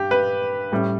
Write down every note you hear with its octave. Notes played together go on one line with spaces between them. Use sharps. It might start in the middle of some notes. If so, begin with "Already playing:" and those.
Already playing: G2 G4
B4
A2 G3 C#4